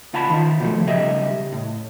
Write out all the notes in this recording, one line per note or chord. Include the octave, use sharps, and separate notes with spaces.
C#2 F4 F#5 A5 B5
D#3 F4
B2 F3 A3
B1 C#3 G3 D#5 E5
A2